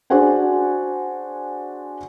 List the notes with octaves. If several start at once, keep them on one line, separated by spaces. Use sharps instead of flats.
D4 F#4 G#4 C5 F#5 G#5